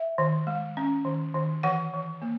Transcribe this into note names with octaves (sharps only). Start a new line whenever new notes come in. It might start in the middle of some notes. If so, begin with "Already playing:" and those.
Already playing: E5
D#3
G#3
C#4
D#3
D#3
E3 F#5
E3
A#3